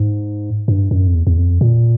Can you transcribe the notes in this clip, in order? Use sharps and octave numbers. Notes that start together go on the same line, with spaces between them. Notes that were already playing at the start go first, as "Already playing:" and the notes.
Already playing: G#2
G2
F#2
F2
E2
E2
F2
A#2